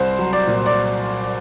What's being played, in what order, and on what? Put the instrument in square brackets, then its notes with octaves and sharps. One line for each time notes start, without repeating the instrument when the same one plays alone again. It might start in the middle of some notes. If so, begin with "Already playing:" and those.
Already playing: [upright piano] C2 C5
F#3
D5
A#2
D5